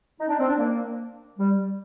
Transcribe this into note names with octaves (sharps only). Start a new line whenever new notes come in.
D#4
D4
C4
D4
A#3
G3